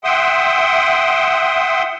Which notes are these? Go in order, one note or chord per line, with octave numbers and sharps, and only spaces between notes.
E5 F#5 G5 C6 D#6